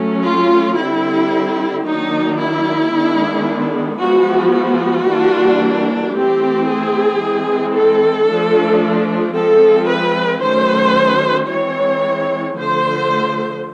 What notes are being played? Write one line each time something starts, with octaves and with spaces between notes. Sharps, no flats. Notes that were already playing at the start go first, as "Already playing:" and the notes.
Already playing: F#3 A3 C#4
F4
D3 G3 C4 E4
D#3 F#3 A#3 D4 D#4
E4
D#3 G#3 B3 D4
F3 G#3 B3 F#4
F#4
E3 G3 A#3 D4
E3 A3 C4 G4
G#4
E3 G#3 C4
A4
F3 A3 D4
F3 G#3 C4 A4
B4
D#3 F#3 A3 C#4 C5
E3 G#3 C4 C#5
D3 F3 A3 C5